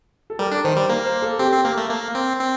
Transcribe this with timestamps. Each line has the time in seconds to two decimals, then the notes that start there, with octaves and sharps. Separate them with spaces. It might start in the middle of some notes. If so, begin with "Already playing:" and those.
0.30 A4
0.39 G3 A#4
0.52 D4
0.64 D#3 C5
0.77 G3
0.89 A#3 A#4
1.06 C5
1.22 A4
1.39 C4 G4
1.52 C4
1.64 A#3 A#4
1.77 A3
1.90 A#3
2.15 C4
2.40 C4